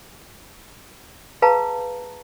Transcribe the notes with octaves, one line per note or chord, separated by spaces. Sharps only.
G#4 B4 F5 A5 A#5